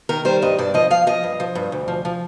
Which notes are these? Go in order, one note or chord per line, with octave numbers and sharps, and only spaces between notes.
D#3 A#4
G3 C5
G2 D#5
G2 D5
F3 D#5
F3 F5
F3 D#5
G2
F3
G2
D2
F3
F3